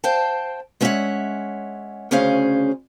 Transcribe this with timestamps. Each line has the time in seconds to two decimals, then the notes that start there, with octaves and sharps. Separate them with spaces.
0.04 C5 F5 G5 A5
0.81 G#3 B3 C#4 C#5 E5 F#5
2.11 D2 C#3 C#4 G#4 C5 F5